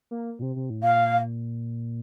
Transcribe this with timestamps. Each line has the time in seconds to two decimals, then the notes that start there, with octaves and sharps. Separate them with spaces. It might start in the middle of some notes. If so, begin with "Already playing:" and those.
0.11 A#3
0.39 A#2
0.42 C3
0.56 C3
0.70 A2
0.83 A#2 F5